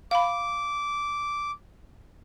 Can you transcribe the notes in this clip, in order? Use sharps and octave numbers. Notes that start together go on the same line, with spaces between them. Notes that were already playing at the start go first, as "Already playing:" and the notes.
F5 B5 D6